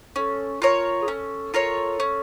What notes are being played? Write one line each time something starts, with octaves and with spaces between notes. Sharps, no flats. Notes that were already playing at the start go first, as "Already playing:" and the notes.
C#4 A4
F4 A#4 C#5
G#4
C#4 A4
F4 A#4 C#5
C#4